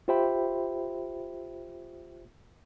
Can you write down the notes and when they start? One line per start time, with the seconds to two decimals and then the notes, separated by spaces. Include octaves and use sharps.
0.08 F4 G4 C5 E5 G5 B5